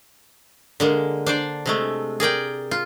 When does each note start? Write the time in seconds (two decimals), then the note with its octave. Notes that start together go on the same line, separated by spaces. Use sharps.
0.80 D3 G#3 A#3
1.26 D4 C5 D5
1.66 C3 G#3 A3
2.20 G#4 A#4 D5 G5
2.71 F4